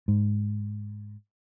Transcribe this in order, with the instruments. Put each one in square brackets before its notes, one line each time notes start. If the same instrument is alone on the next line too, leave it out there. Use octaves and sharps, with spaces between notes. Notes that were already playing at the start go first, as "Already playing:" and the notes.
[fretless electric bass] G#2